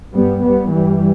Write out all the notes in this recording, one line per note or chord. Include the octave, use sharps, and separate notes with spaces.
G2 G3 B3
G3 B3
G2 E3 G3